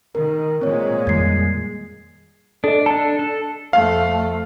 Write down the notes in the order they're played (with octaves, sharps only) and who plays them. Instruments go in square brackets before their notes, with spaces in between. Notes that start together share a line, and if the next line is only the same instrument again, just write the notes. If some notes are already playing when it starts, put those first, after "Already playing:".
[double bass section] D#3 [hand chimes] A#4
[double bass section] A#2 G#3 [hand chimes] C4 C#5
[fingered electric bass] F2 D#3 G3 [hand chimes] G#6 C7
[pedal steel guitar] D4 [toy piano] A4 D#5
[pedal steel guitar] D4 A4 [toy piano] A5
[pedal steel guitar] A4
[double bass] F2 A3 [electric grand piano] F5